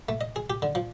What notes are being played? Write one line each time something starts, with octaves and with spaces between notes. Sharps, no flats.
A3
D#5
G#4
G4
D3
F3